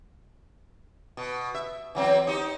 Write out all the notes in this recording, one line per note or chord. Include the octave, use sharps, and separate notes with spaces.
B2
E5
E3 F#3 C4
D#4 G4 C5